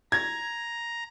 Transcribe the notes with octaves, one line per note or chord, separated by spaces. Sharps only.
A#5 G#6